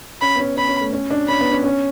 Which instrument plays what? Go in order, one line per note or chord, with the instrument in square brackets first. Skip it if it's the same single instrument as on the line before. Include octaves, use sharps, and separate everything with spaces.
[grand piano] C#4 [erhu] B5
[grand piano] B3
C#4
[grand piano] C#4 [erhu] B5
[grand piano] C#4
A3
C#4
D4
[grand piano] C#4 [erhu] B5
[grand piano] B3
C#4
C#4